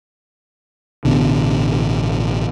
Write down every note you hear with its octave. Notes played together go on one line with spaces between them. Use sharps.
A1 B2 D3